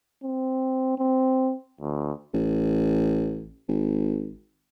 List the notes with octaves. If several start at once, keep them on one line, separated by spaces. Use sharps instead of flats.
C4
C4
D2
A1
G#1